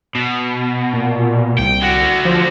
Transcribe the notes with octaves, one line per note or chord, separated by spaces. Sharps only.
B2
A#2
C2 G5
D3 F#4
F3